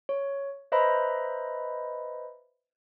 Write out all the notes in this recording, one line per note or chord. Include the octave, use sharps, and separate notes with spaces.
C#5
B4 C5 D#5 E5 A#5 B5